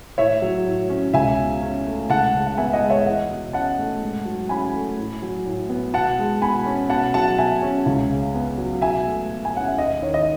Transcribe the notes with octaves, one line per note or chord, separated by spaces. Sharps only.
A2 C#5 E5
F#3
A2
C#4
C#2 E5 G#5
B2
C#4
A3
C#2 F#5 A5
C#3
F#5
B3 E5 G#5
D#5 F#5
G#3
C#5 E5
E2 D#5 F#5
B2
C#4 F#5 A5
A3
G#2
F#3
C#4 G#5 B5
A3
A2
F#3
A2
B3
B2 F#5 A5
G#3
B2 G#5 B5
C#4
B2 F#5 A5
F#3 F#5 A5
B2 E5 G#5
C#4
C#2
C#3
B3
F#3
B2 E5 G#5
A3
B2
G#5
C#4 F#5
E5
D#2 D#5
D#3 C#5
D#5